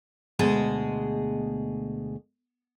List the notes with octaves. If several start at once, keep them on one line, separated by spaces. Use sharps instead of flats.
D2 B2 G#3 G#4 A5